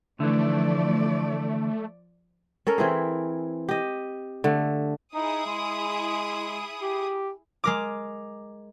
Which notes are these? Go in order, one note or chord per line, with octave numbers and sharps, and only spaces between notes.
D3 E3 F3 A3 D5
C#4 A4 A#4
E3 C4 E4 G#4
G4 D#5
D3 A3
D#4 E4 G#4 D#6
G#3
G4
G#3 A#4 D6